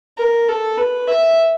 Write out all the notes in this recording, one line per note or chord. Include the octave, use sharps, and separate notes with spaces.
A#4
A4
B4
E5